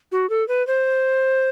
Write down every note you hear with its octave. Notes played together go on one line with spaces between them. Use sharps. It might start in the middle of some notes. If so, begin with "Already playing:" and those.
F#4
A4
B4
C5